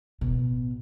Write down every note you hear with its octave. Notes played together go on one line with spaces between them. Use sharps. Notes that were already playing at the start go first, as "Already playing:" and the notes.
A1 B2